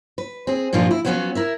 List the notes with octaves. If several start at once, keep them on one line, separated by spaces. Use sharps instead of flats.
B4
C4 G#4
G2 A#2 D#3 F3 G3 F4
E4
F3 F#3 B3 C#4 F#4 F5
E4 A#4 E5